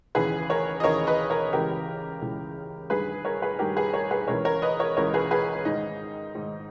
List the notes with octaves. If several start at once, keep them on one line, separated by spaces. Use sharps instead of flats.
D#2 C#3 E3 G#4 B4
A#4 C#5
D#5
D#2 C#3 E3 A#4 C#5
B4 D#5
A#4 C#5
C#2 C#3 E3 G4 A#4
C#2 C#3 E3
G2 D#3 G#4 B4
A#4 C#5
G#4 B4
G2 D#3 G4 A#4
G#4 B4
A#4 C#5
G#4 B4
C#2 C#3 E3 A#4 C#5
A#4 C#5
B4 D#5
A#4 C#5
C#2 C#3 E3 A#4 C#5
G#4 B4
G#4 B4
G#2 D#3 D#4
G#2 D#3